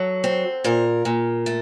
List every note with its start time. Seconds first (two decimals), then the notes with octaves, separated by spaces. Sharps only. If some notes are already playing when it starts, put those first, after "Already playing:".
Already playing: F#3 A4
0.24 C4
0.64 A#2 A#4
1.05 A#2
1.46 A3